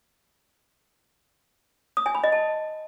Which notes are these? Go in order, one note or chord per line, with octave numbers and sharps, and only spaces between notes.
D#6
G#5
B5
D#5
A5